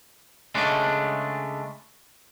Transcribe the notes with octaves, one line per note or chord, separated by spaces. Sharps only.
C#3 G#3 A3 D4